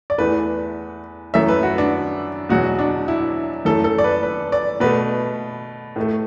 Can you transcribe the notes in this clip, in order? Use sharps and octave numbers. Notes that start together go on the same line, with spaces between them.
D5
E2 E3 A3 B4
F#2 E3 A3 E5
B4
F#4
D4
E2 B2 F#3 F#4
D4
E4
F#2 E3 A3 A4
A4
D5
B4
B4
D5
B2 A3 B4
A2 A3